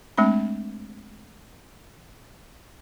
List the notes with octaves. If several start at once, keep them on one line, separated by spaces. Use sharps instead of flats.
G#3 A3 C4 D4 B5